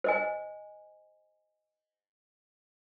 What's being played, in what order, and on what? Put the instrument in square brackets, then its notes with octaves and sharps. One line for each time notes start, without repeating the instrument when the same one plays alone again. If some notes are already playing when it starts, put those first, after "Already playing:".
[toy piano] C5 D#5 G#5